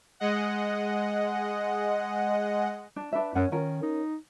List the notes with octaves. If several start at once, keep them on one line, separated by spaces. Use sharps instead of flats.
G#3 D#5 F#5
D4
D4 B4 E5
F#2 C#4 F#5
D#3 C#4 F4 A#4
D#4